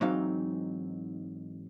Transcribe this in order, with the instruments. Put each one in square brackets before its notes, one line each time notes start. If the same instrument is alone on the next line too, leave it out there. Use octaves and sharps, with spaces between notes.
[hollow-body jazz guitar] G#2 E3 F#3 C4 D#4 F5